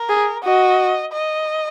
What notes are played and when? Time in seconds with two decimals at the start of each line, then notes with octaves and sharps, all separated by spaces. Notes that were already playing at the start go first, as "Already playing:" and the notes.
Already playing: A#4
0.09 G#4
0.44 F#4 D#5
1.12 D#5